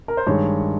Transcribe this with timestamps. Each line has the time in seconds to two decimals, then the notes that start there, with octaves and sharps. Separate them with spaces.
0.08 A#4
0.17 C5
0.27 G2 D#3 G#3 C#5